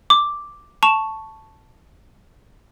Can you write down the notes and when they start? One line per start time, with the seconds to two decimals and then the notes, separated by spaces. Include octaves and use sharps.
0.10 D6
0.83 A5 C#6 E7 F7